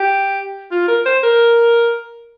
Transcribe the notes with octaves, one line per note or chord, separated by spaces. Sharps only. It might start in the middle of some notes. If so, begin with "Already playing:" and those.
Already playing: G4
F4
A#4
C5
A#4